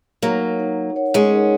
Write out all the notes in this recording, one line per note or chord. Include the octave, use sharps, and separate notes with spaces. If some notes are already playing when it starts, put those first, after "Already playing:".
F#3 A#3 D#4 A#4 C#5 F#5
D#4 A#4 C#5 F#5
D#4 A#4 C#5 F#5
G#3 C#4
D#4 A#4 C#5 F#5